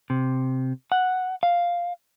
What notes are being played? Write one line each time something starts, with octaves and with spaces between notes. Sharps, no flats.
C3
F#5
F5